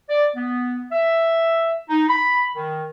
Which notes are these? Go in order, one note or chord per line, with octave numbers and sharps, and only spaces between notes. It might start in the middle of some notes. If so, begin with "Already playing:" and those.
D5
B3
E5
D#4
B5
D#3